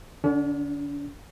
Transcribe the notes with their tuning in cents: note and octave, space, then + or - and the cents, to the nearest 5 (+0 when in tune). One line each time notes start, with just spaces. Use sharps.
D3 +10 D4 -45